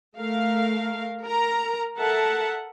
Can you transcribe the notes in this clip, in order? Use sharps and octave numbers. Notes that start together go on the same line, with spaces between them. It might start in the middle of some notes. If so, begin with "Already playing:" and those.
A3 A#4 F5
A#4 A#5
A4 A#4 E5 F#5 A5